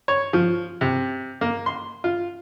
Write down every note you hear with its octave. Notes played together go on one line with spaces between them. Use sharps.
C#5
F3
C3
A#3
C6
F4